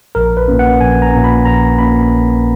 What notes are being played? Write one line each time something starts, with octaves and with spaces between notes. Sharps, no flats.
A#1 A#4
B4
A#2 A#3 C#4
F#5
A#1 G#5
A#5
A#2 A#3 C#4
B5
A#1 A#5
A#2 A#3 C#4 B5
A#1